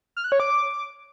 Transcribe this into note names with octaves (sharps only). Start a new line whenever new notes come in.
F6
F#6
C#5
D6